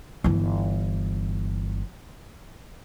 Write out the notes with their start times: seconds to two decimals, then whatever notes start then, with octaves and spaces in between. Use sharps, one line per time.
0.24 G1 E3